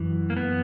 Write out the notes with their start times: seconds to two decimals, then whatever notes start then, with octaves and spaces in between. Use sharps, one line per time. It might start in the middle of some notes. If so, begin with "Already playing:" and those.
Already playing: F#2 E3
0.30 A#3
0.37 B3